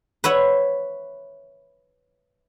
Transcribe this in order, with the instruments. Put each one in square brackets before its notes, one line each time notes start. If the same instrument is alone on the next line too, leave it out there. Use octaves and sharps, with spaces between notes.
[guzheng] B4 C#5 E5 F#5